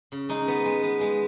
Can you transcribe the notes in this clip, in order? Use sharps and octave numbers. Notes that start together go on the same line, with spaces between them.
C#3
G#3 D#4
B3
G#3
B3
G#3